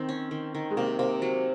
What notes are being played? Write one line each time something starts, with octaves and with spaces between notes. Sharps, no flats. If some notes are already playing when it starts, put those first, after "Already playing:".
Already playing: D#3 C4
C#4
D#3
D#3
G#3
C3 A#3
C3 A#3
F#3